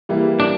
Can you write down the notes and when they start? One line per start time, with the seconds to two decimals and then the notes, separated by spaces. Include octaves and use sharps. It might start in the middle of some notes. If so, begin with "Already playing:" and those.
0.09 E3 G3 A#3 E4
0.40 D4